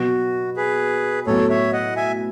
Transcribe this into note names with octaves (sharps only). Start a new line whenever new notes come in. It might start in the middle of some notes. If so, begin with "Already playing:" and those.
Already playing: B2 F#3 B3 F#4
G#4 B4
A2 F#3 B3 A4 C#5
C#5 E5
D#5 F#5
E5 G#5